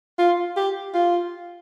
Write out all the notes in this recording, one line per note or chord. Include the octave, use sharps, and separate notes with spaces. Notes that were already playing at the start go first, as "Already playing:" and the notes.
F4
G4
F4